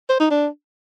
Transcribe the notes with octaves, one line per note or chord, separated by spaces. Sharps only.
C5
D#4
D4